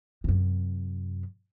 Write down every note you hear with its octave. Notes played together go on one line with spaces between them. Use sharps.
F#2 C3